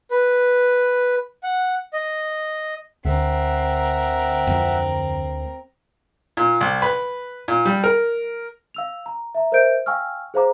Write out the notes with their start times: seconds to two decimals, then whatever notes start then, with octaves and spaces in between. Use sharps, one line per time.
0.11 B4
1.43 F#5
1.93 D#5
3.05 D2 C4 A#4 E5 F#5
4.47 F2 E3
6.37 A#2
6.61 C2
6.82 B4
7.48 A#2
7.66 G3
7.84 A#4
8.74 F5 E6 F7
9.06 A#5
9.35 E5 A#5
9.52 A#4 C5 D#5 E5 G6 D7
9.86 F5 G5 G#5 C#6 E6 F6
10.34 G#4 C5 F5 A#5 D6